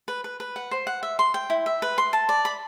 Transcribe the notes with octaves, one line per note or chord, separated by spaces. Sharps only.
B4
B4
B4
F#5
C5
F#5
E5
C6
G5
E4
E5
B4
C6
A5
D5
B5